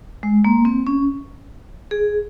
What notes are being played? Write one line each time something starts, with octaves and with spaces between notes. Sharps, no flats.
G#3
A#3
C4
C#4
G#4